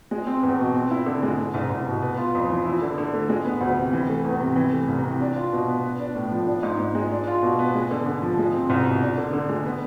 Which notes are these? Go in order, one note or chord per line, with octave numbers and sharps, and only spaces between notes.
G#3
C4
E2
B2
C4
E4
D3
G#3
A3
C2
C2
B2
B3
F4
F2
E3
E4
D3
D3
A3
G#3
B3
D2
C3
E3
A3
E2
C3
E3
A3
C2
C3
D4
F4
B2
B3
B3
D4
A2
F3
D4
G#2
G#2
G#3
D4
F4
B2
B3
G#3
D3
D3
F3
G#3
C4
C2
B2
D4
D3
D3
G#3
B3